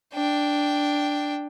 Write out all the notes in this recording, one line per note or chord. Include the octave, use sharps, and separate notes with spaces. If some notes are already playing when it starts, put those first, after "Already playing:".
D4 G5